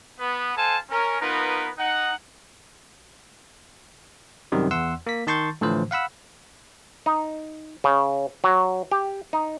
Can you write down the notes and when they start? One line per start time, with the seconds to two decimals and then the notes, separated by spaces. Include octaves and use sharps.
0.19 B3
0.56 A4 C5 F5 G#5 A5
0.91 C#4 A#4
1.21 B3 D#4 F4 A#4 B4
1.78 D#4 F#5
4.52 F#2 C3 D#3 G3
4.71 E2 F#5 C6 E6
5.07 A#3 B6
5.27 D#3 A5 C6 C#6 G6 A6
5.61 A2 D3 E3 F3 C5
5.91 F5 F#5 B5 E6
7.06 D#4
7.84 C#3
8.44 F#3
8.92 G4
9.33 D#4